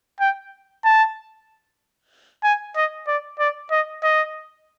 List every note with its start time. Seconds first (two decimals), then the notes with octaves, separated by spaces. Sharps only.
0.20 G5
0.84 A5
2.44 G#5
2.76 D#5
3.07 D5
3.39 D5
3.71 D#5
4.03 D#5